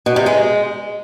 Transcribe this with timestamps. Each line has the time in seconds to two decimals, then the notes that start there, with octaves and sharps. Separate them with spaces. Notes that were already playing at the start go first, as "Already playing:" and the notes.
0.06 B2
0.16 C3
0.26 G#3